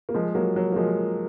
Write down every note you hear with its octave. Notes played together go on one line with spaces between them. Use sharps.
A#3
F3 G#3
F#3 A#3
F#3
A#3
F3 G#3